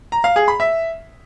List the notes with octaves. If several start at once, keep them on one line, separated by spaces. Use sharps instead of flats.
A#5
F5
G#4
B5
E5